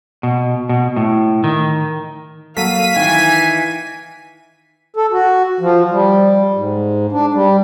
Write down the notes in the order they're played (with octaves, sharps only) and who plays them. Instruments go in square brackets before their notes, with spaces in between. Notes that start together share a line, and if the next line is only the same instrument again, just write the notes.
[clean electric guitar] B2
B2
A2
D#3
[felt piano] F#3 A#3 A4 [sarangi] F5 [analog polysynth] B6 D#7
[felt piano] D#3 [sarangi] E3 [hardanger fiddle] G#5
[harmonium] A4
F#4
F3
G3
G#2
D4
G3